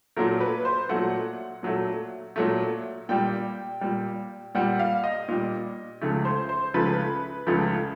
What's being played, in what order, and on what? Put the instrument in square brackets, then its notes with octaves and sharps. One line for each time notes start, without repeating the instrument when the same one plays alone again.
[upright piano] A#2 F#3 A3 A#4
B4
C5
A#2 F#3 A3 F#5
A#2 F#3 A3
A#2 F#3 A3
A#2 G3 G5
A#2 G3
A#2 G3 F#5
F5
D#5
A#2 G3
C#2 C#3 F3 A3
C5
C5
C#2 C#3 F3 A3 B4
C#2 C#3 F3 A3